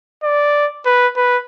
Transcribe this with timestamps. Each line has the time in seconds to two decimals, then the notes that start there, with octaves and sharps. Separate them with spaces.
0.23 D5
0.86 B4
1.16 B4